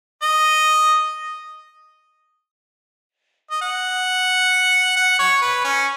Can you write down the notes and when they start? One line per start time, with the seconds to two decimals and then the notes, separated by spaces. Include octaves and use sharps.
0.22 D#5
3.51 D#5
3.61 F#5
4.96 F#5
5.19 C#5
5.42 B4
5.64 C#4